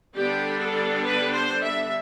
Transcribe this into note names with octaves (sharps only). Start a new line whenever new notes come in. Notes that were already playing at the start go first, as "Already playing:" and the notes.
D3 G3 B3 D4 G4
A4
B4
C5
E5